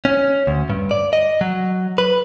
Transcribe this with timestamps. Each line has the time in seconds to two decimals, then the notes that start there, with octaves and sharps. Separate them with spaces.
0.05 C#4
0.47 D2
0.70 G2
0.91 D5
1.13 D#5
1.41 F#3
1.98 B4